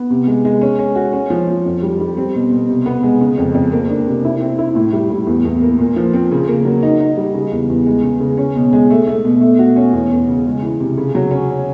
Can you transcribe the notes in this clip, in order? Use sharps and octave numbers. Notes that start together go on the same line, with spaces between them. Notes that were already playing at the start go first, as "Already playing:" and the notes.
Already playing: B3
C3
G#3
G#3
C#4
C#4
F#4
C#4
F3
F3
F2
G3
G3
C4
B2
B2
C3
B3
G#3
C#3
F2
F2
A#3
D4
C3
E4
C4
E4
A2
G3
A2
E2
E2
A#3
A#2
F3
C4
C#3
A#3
F#3
D#4
D#4
G3
C#3
E2
E2
G#3
C#3
C#3
C#4
B2
G#3
A3
A3
B2
A3
F#4
C#4
E2
E2
C#3
G#3
E3
C3
C#3
F#3
C#4